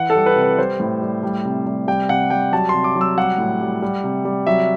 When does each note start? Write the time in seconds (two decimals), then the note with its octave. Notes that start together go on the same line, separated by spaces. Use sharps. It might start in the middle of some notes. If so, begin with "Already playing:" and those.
Already playing: E3 F#5
0.10 A4
0.15 G3
0.26 B4
0.36 C3
0.42 B4
0.58 G3 C5
0.80 A2
1.02 G3
1.23 G3
1.45 C3
1.66 G3
1.88 G3 G5
2.09 C3 F#5
2.30 G3 G5
2.52 F#3 A5
2.69 C3 C6
2.84 D6
2.96 F#3
3.01 E6
3.17 G3 F#5
3.38 A2
3.61 G3
3.82 G3
4.04 C3
4.25 G3
4.47 F#3 E5